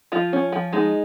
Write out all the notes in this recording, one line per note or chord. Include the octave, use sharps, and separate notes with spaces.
F3 F4
C#4
F3
G#3 D#4